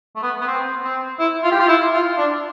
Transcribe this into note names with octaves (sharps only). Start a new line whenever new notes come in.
A3
B3
B3
C4
C4
E4
F4
G4
F4
E4
F4
D4